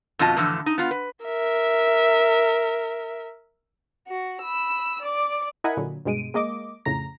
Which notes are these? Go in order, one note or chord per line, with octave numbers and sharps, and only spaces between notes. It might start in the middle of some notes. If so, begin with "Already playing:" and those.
F2 B2 F4 D#5 A5
A2 D3 E3 F3 A#3
D#4
B3 F4
B4
A#4 E5
F#4
B5 E6
D5 D6
E4 A#4 D#5 F#5 G#5 B5
A#2 D3 F#3
G2 B2 G#3 D7 D#7
G#3 A#3 D#5 D6
F2 A2 C#3 A#5 A#6